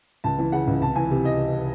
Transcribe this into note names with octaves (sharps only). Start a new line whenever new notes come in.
C#2 A5
E3
C#3 F#5
C#2
C2 A5
E3 G#5
C3
D#5